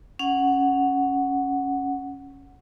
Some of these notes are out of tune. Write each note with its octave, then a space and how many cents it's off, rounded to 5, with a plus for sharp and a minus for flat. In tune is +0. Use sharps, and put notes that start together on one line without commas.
C#4 +0 F#5 +0